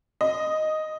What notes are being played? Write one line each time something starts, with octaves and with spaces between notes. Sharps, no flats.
D#5